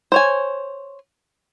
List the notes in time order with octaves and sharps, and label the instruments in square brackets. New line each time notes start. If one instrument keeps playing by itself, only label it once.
[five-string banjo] C5 C#5 G#5